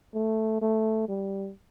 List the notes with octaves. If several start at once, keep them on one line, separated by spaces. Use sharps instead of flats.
A3
A3
G3